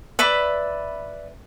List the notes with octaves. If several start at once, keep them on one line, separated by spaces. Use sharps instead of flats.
B4 D5 E5 B5